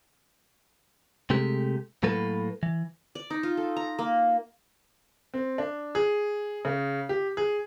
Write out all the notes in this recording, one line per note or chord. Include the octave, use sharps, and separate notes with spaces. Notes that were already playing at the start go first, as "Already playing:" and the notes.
C3 G#3 A3 G4
A2 F#3 A#3 A4 B4
E3
D5
D#4
F4
A4
A#5
A#3
C4
D4
G#4
C#3
G4
G#4